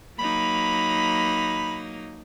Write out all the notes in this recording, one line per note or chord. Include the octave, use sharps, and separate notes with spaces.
F#3 A#3 D#4 B5